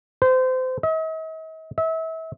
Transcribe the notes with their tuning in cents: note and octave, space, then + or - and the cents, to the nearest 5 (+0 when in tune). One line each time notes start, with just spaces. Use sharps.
C5 -30
D#5 +45
E5 -35